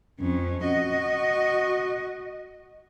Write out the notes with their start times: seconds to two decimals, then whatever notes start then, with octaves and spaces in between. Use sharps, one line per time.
0.20 F2 C#4
0.64 F#4 D#5